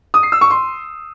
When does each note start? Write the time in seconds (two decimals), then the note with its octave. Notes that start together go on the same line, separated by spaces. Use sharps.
0.14 D#6
0.23 C7
0.32 E6
0.41 C#6
0.50 C6